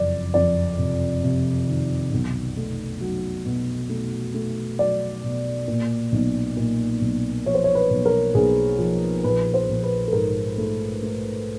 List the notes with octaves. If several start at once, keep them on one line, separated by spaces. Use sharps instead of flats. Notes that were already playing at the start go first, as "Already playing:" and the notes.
Already playing: F#1 F2 D5
F2 D5
C3
C3
D#3
B1
A3
F#3
B2
A3
A3
F#3 D5
B2
A#2
B1
A#2
B1
F3 C#5
C5
C#5
B4
B1
A#4
B1 G#4
F3
A#1 B4
C5
A#1
B4
A4
G#2 A#4
A3
A3